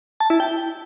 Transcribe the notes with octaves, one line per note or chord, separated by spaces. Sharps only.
A5
E4
G5